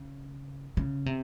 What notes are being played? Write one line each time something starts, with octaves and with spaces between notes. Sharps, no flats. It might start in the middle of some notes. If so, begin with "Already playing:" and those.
Already playing: C#3
C#3
C3